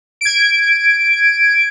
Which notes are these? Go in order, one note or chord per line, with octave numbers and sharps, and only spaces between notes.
G#6 D7